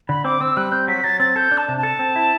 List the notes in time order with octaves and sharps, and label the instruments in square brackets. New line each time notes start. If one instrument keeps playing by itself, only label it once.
[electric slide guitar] D3 [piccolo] B5
[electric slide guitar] C4 [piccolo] D6
[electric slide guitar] C4 [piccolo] E6
[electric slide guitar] G3 [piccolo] F#6
[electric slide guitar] C4 [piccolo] G6
[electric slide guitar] F#3 [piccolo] B6
[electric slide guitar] F#3 [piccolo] A6
[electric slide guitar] C4 [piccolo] A6
[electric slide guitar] A4 [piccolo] G6
[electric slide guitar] D4
[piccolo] A5
[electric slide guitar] C3
[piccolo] A5
[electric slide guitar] A4
C4
E4